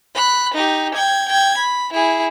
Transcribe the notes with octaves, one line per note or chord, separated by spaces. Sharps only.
B5 F#6
D#4 G4
G5 G#6
G5 G#6
B5
E4 G#4